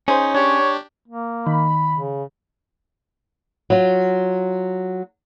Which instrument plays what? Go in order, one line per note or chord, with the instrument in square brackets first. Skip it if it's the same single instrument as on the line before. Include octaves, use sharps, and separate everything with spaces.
[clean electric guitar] C#4 [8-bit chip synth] D#4 [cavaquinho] G#4 C5
[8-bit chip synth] D4 G4 [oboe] C#5
[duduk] A#3
[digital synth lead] D#3 [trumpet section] B5
[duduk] C#3
[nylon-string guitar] F#3 F4